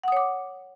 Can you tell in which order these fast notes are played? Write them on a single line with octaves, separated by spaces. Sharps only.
F#5 D#6 C#5 D6